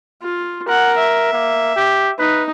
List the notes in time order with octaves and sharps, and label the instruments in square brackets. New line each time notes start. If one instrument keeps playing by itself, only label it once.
[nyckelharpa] F4
[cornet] A#4 [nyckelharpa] F#5
[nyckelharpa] E5
[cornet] A#3
G4
[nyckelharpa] D#4 [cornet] B4